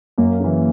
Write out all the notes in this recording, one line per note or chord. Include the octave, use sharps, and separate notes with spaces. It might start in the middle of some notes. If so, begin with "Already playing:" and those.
F#2 A#3
C#3 E3